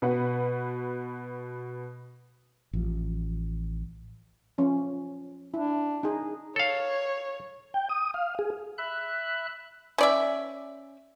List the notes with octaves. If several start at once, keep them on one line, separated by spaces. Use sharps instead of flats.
B2 B4 F#5
A1 F3
F3 C#4
D4 E4
D#4 G#4
A4 C#5 F5
G5
D#6
F5
G#4
E5 B5 F#6
C#4 D5 E5